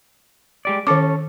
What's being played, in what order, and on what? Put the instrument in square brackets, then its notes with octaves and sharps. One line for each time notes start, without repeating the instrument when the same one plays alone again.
[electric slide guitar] G#3 G4 D5
[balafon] D#3 D6 [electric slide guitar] C#4 A4